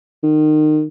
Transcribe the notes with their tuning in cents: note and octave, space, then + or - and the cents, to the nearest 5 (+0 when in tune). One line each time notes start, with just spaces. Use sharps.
D#3 -25